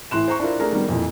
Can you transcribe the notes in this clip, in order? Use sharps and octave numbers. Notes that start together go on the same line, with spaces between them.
A2 E3 C6 F#6 E7
C5 A#5 C#6
D4 E4 F4 A#4
A3 D4 G#4 A#4
D#3 G3 B3
F2 A#2 E3